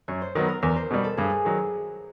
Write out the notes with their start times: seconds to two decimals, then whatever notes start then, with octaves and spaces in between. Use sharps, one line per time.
0.08 F#2 C#5
0.22 C5
0.35 D#3 F#3 B3 B4
0.48 A#4
0.62 E2 A#4
0.76 C5
0.91 B2 G3
1.04 A4
1.17 G2 G#4
1.45 D#3 F#3